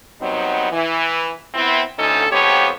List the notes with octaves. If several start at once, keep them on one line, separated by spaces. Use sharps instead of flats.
F#3 G3 B3 C4 D#4
E3 E4
B3 C4 E4
D2 A2 D3 C#4 D#4 A4
F2 G#2 F3 B3 G4 C#5